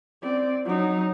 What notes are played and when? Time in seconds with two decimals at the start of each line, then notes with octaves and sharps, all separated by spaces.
0.22 C4 D5
0.65 F#3 D#4